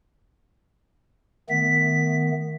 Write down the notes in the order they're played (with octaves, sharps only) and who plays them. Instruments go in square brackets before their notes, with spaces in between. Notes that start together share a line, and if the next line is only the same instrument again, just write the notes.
[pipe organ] D#3 A3 B3 [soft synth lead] B6